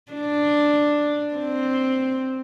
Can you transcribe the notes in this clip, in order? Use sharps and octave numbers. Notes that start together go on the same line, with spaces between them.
D4
C4